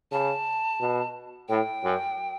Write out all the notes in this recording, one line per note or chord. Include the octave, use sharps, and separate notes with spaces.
C#3 A5
B2
A2 G5
F#2